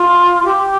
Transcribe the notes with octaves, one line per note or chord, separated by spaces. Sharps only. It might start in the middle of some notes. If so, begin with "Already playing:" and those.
Already playing: F4
G4